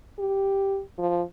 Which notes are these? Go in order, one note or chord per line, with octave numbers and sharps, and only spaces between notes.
G4
F3